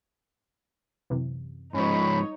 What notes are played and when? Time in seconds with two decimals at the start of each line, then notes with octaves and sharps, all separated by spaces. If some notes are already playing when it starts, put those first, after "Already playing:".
1.10 F#2 C3 E3
1.74 G#2 F3 C#4 D#4 C5 C#5 B5